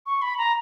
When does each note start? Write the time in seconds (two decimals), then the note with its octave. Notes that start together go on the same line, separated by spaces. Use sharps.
0.06 C#6
0.22 B5
0.38 A#5